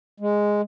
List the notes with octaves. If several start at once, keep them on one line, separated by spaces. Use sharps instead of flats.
G#3